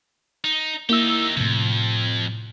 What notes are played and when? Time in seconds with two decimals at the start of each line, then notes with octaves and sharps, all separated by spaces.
0.44 D#4
0.89 A#3 D#4 E4 G4 E6
1.37 F2 A2 C3